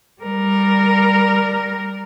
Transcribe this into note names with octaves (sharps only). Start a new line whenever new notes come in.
G3 A#4